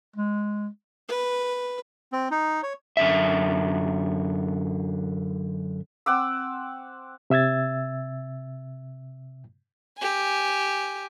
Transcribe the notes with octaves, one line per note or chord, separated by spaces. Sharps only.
G#3
B4
C4
D#4
C#5
F#2 D3 E5
C4 F#5 D6 E6
C3 E5 E6 G#6 A6
G4 G#5